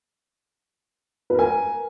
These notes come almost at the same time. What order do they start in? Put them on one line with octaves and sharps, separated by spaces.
B4 A#4 G#5